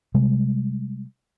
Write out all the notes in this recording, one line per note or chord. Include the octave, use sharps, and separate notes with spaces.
C3 G3 G#3